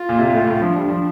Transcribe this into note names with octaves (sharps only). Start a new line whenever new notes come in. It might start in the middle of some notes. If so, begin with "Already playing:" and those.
Already playing: F4
A#2
C3
A2
A2
F3 D4
G3
F3